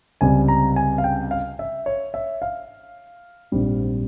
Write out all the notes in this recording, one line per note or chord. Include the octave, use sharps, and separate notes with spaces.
C#2 C3 G3 G#5
A#5
G#5
F5
G5
F5
E5
C#5
E5
F5
A#1 G#2 G3 C4